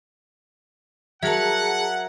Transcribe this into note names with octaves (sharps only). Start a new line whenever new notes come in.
F#3 G#4 A#4 E5 F#5 A5 G#6 A#6